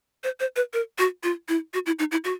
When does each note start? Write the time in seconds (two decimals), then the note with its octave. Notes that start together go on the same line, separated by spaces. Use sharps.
0.24 C5
0.40 C5
0.56 B4
0.73 A#4
0.98 F#4
1.23 F4
1.49 E4
1.74 F#4
1.86 E4
1.99 D#4
2.12 E4
2.24 F#4